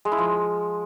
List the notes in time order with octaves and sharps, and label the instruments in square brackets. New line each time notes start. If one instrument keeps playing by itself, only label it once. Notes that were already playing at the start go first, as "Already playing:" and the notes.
[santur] G#3
E4
F3